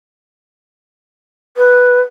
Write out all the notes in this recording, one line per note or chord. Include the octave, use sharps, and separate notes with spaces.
B4